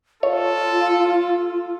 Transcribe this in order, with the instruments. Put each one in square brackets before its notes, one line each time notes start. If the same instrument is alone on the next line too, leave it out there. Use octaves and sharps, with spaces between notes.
[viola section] F4 [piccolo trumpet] A4 [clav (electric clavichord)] C#5 [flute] F5